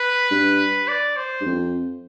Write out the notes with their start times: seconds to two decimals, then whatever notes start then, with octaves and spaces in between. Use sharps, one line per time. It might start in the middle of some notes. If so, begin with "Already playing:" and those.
Already playing: B4
0.31 G2
0.88 D5
1.17 C5
1.41 G2
1.46 F2